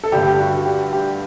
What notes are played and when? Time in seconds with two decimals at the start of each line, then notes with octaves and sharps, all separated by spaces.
0.04 A4
0.12 G2 D3 A3 G4
0.27 G4
0.39 F#4
0.66 G4
0.93 G4